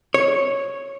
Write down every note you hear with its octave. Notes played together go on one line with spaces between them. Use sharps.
C#5